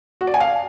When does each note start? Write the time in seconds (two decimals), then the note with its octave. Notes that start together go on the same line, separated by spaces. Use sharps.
0.21 F#4
0.27 D5
0.34 G#5
0.40 F5